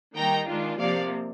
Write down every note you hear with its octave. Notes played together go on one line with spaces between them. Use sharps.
D#3 G3 A#3 D#4 G5 A#5
D#3 G#3 D4 F4
C3 F3 A#3 D5 F5